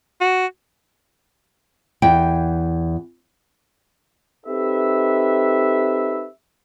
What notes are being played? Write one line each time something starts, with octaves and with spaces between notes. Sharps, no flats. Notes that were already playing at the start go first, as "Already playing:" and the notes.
F#4
E2 G5
C4 D#4 G4 A4 B4 E5